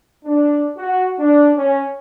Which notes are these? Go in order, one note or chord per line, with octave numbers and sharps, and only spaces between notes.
D4
F#4
D4
C#4